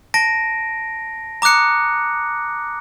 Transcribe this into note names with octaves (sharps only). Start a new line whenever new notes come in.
A5 A#6 D7
A#5 D6 D#6 F#6 C#7